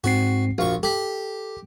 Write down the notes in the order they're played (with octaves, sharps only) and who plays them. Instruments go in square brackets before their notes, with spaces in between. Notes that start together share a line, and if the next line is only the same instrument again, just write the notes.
[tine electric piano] G#2 C4 C7 [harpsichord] F#4
[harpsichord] A#1 C#6 [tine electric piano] F#4 F5
[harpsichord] G4 [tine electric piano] A4